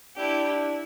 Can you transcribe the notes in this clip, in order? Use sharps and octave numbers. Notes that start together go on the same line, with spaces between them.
D4 E4 G4
E4